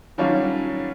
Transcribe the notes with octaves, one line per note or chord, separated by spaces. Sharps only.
D#3 F#3 G3 C#4 D4 F4